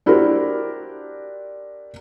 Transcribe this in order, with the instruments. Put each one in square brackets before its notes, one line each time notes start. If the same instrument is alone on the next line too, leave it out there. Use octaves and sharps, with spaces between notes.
[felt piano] D4 E4 F#4 G4 A#4 C5